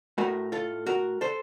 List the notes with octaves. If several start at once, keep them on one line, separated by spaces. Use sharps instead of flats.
A2 A3 F#4 A#4
F4 A4
F#4 A#4
A4 C5